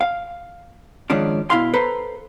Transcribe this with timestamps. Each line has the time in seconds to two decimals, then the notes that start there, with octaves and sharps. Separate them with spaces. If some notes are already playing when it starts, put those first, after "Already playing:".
0.01 F5
1.10 G#2 D#3 F3 C#4 D4
1.50 B2 E4 F5 C6
1.74 A4 B4 C5 A#5 C6